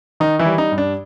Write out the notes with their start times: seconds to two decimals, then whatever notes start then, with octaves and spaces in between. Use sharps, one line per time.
0.20 D#3 D#4
0.39 E3 E4
0.45 G3
0.58 D#4
0.72 G2
0.78 D4